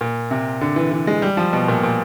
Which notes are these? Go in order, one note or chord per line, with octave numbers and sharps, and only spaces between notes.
A#2
C3
D3
E3
E3
G#3
G3
F3
B2
A#2
A#2